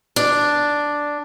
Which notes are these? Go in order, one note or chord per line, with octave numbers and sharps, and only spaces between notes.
D4